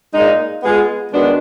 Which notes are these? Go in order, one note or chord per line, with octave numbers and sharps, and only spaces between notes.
A#2 G#3 D#4
G#3 B3 F4 G#4
D#3 G#3 B3 D4 F#4